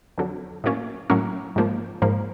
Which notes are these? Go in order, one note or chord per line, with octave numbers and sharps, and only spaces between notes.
F2 D3 F#3
A2 F#3 A#3 C#4
A2 F#3 A#3 C#4
G#2 F3 A#3
G#2 F3 A#3